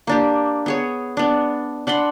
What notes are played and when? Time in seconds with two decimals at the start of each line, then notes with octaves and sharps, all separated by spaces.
0.07 A#3 D4 G4
0.66 B3 G#4 C#5
1.17 B3 D4
1.87 D4 F#5 B5 C6